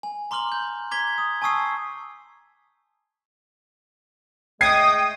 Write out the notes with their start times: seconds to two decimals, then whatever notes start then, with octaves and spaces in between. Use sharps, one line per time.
0.03 G#5
0.31 A#5 C6 D6 F6 F#7
0.52 G6
0.91 A#5 D6 G#6 B6 G7
1.18 D#6
1.42 G#5 A5 C#6 D#6 E6 C7
4.61 G#3 A3 D#5 G5 D#6 G#6 C7